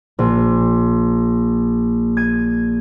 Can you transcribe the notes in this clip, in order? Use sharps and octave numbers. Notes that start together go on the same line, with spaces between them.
A#1
G#6 D#7